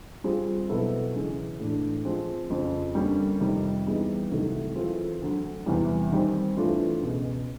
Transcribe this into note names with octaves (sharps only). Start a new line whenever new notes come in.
G3 C4 F4 G#4
B2 F#3 B3 E4 A4
C#3 E3 G#3 C#4
A2 E3 A3 D4
F3 G#3 C4
F2 C#3 F3
D3 G3 A#3 C#4
F2 C3 D#3 G3
E3 G3 B3 D#4 G#4
C2 C3 D#3 F#3 A3
E3 G#3 C4 F4 A4
D2 D3 F#3
E2 C3 E3 G3
D#3 G3 C4
G2 E3 A3 D4 F4
C#2 B2 G#3